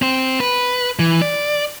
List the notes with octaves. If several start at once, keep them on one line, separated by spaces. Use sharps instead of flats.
C4 C5
B4
E3
D5